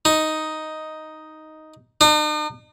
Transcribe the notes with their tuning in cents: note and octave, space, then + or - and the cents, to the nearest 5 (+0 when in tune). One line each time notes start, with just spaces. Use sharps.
D#4 +5
D#4 -45